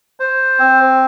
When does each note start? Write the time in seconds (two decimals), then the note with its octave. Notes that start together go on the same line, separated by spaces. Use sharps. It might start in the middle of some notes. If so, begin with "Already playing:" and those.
0.20 C5
0.59 C4